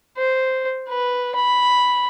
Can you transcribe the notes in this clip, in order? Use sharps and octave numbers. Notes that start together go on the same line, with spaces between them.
C5
B4
B5